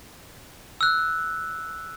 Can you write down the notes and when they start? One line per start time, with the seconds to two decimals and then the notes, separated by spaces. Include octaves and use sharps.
0.81 E6 F#6